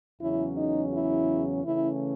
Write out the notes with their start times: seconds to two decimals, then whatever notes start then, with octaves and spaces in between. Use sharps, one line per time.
0.21 E2 C#3 F#3 C#4 E4
0.56 D#4
0.92 E4
1.64 C#3 E3 A3 C#4 E4